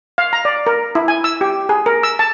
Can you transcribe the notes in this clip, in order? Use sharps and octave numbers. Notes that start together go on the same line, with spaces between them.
F5
A#5
D5
A#4
E4
G#5
E6
G4
G#4
A#4
E6
A5